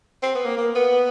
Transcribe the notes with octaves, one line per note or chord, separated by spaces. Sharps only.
C4
B3
A#3
A#3
B3